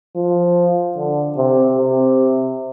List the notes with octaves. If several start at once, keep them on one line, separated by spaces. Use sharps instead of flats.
F3
D3
C3
C3